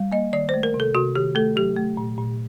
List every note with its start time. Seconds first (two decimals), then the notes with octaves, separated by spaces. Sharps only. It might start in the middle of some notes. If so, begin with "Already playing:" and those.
Already playing: G3
0.12 A#3 D#5
0.33 D#3 D5
0.49 A3 C5
0.63 A#4
0.74 C3
0.80 A4
0.94 C3 F#4
1.15 D#3 G4
1.35 A3 A4
1.56 F#3 G4
1.77 A3
1.97 A#2
2.18 A#2